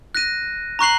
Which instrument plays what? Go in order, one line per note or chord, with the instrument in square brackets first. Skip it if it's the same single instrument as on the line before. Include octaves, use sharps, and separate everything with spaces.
[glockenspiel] F#6 A#6 D#7
A#5 C#6 F#6 C7 F#7